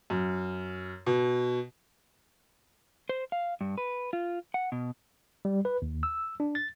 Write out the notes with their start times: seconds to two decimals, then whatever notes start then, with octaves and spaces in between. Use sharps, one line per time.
0.10 F#2
1.06 B2
3.09 C5
3.32 F5
3.61 G2
3.78 B4
4.13 F4
4.54 F#5
4.72 B2
5.45 G3
5.65 B4
5.82 D#2
6.03 E6
6.40 D4
6.55 A6